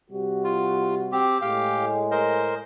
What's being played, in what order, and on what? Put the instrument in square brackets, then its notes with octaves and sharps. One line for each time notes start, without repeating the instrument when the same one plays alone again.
[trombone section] C3 G3 F#4
[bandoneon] F4
C4 G4
[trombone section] A2 G#3 [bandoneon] G4 F5 G5
[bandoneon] A#4 C5 D#5